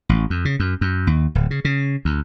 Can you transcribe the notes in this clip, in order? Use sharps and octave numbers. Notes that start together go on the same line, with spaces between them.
A1
F2
C#3
F#2
F#2
D#2
D1
C#3
C#3
D2